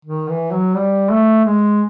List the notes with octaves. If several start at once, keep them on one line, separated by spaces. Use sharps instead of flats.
D#3
E3
F#3
G3
A3
G#3